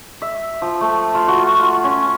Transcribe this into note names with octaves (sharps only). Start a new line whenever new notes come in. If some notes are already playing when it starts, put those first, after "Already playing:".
E5
F3
A3
F4
F#4
F4
C#4